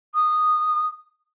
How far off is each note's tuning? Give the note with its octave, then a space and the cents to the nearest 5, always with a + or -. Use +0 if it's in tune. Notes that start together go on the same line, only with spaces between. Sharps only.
D#6 -10